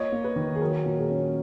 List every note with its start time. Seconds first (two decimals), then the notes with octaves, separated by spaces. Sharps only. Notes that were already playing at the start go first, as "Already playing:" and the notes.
Already playing: A#3 F4 C#5 D#5
0.12 A#3
0.24 B4
0.36 D#3
0.55 G#4
0.60 F#3 A#4
0.86 A#2
0.98 G#4
1.10 C#4